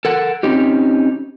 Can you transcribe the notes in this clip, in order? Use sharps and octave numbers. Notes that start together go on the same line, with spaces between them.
A4 A#4 F#5
C4 C#4 D#4 G4